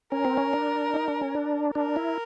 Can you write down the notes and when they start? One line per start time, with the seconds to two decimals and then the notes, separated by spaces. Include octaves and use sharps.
0.12 C#4 A#4
0.25 C4
0.37 C#4
0.53 D4
0.94 D#4
1.08 D4
1.21 C#4
1.35 D4
1.75 D4 A#4
1.96 E4